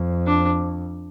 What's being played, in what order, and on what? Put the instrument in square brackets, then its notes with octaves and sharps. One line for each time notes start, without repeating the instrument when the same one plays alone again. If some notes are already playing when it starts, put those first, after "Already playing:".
Already playing: [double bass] F2
[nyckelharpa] D4